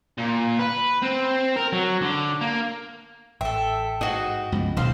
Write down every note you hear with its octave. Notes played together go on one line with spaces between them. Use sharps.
A#2
B4
C4
A#4
F#3
D3
A#3
A1 A4 E5 G5
G#2 F#4 D#5
C#2 G2 F3 B3
D#1 B1 B2 C5 F5